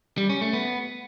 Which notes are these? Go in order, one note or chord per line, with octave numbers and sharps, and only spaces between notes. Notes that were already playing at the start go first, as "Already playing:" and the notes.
G3
C#4
A3
B3